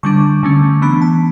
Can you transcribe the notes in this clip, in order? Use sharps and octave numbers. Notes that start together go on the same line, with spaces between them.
D3 G3 D4 C#6
D3 A3 C#4
E3 B3 D4 B5
A5